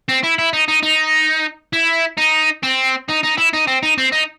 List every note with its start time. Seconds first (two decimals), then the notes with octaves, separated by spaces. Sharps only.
0.09 C4
0.23 E4
0.39 E4
0.53 D#4
0.68 D#4
0.83 D#4
1.73 E4
2.18 D#4
2.63 C4
3.08 D#4
3.23 D#4
3.37 E4
3.53 D#4
3.67 C4
3.83 D#4
3.98 C4
4.12 D#4